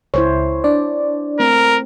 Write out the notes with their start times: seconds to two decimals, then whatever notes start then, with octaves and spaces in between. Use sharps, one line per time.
0.14 C#2 E4 C5 C#5
0.64 D4 D5
1.40 A3 C4 A#4